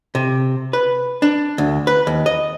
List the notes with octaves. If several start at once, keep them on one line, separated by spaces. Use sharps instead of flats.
C3
B4
D4
D2
B4
D#2
D#5